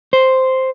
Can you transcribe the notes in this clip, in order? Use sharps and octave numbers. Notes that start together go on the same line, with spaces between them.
C5